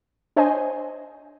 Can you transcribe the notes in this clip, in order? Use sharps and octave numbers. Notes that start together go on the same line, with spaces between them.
D4 C5 C#5 D#5 G#5